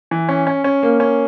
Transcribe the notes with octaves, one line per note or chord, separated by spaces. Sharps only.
E3
C#4
C#4
C#4
A#3
C#4